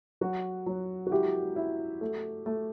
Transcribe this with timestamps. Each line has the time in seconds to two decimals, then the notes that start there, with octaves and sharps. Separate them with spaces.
0.21 F#3 F#4
0.66 F#3
1.07 F#4
1.11 E4 G4
1.56 E4
2.01 A3
2.46 A3